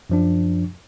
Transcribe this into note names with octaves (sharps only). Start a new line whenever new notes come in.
F#2 F3 D4